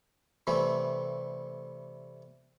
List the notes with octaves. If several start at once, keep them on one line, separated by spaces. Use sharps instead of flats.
C3 E3 G3 A3 C4